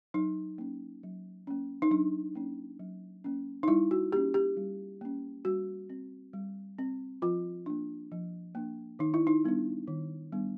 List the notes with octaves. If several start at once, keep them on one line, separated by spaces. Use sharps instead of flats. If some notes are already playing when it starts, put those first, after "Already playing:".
F#3 D#4
A#3 C#4
F#3
A#3 C#4
D#4
F#3 D4
A#3 C#4
F#3
A#3 C#4
D#4
G3 E4
F#4
A#3 C#4 G4
G4
G3
A#3 C#4
G3 F#4
C4
G3
C4
F3 F4
A#3 D4
F3
A#3 D4
D#3 D#4
E4
D#4
G3 B3 D4
D#3
G3 B3 D4